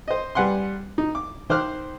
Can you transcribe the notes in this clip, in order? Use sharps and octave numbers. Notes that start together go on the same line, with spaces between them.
C5 D#5
G3 B4 F#5 G#5 C6
D#4
D6
D#3 C5 D6 F6 F#6